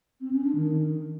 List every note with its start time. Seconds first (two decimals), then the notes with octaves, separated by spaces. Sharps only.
0.21 C4
0.32 C#4
0.44 D4
0.56 D#3